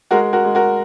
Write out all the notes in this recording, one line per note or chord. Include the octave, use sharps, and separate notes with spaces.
G#3 F#4 A#4
F#4 A#4
G#3
F#4 A#4